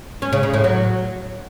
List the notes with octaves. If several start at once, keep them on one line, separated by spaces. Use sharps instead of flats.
C#4
C#3
C#3
A2
F#3